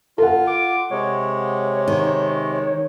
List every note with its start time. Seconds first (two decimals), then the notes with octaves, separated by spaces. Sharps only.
0.18 F4 A4 F#5
0.47 D6
0.91 C3 G#3 C#5
1.88 D#3